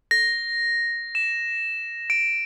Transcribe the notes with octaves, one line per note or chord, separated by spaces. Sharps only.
A#6
E7
D7